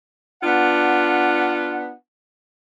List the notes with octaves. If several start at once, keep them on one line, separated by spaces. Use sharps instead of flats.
B3 D4 F4 F#5